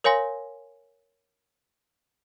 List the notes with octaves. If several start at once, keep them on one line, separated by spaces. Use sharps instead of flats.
A#4 C#5 F5 G#5 C6 A#6